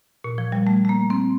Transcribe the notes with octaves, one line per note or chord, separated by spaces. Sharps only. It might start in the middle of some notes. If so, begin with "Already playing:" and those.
A#2
F3
G3
A3
A3
A#3
C4